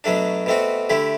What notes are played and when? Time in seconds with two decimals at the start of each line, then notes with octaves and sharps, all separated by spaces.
0.04 B2 F#3 A3 D4
0.46 B2 A3 C4 F#4
0.89 D3 A3 E4 G4